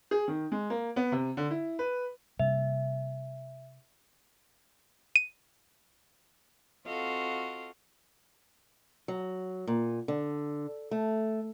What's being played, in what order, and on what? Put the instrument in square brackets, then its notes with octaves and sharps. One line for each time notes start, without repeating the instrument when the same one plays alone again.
[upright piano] G#4
D#3
G#3
A#3
B3
C3
D3
E4
B4
[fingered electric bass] C3 G3 A#3 [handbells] E5
[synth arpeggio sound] D#7
[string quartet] C4 F4 F#4 A4 D#5 F5
[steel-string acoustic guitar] F#3
A#2
D3
A3